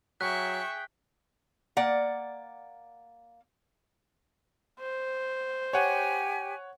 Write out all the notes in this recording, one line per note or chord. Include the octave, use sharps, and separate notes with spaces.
F#3 G#4 E5 G5 C#6 F#6 B6
A#3 D5 F#5
C5
G4 C#5 F#5 G#5